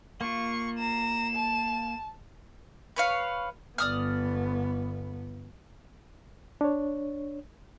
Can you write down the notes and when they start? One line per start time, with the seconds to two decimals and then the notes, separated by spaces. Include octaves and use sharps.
0.21 A#3 F4 C#6
0.79 A#5 E7
1.35 A5
2.96 B4 C#5 F5
3.78 G1 B3 D5 D#6 F6
6.61 D4 C#5